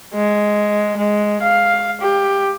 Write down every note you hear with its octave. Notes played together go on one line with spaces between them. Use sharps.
G#3
G#3
F5
G4